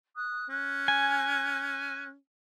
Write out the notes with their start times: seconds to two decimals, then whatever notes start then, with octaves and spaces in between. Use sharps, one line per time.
0.15 D#6 F#6
0.49 C#4 F#6
0.88 G#5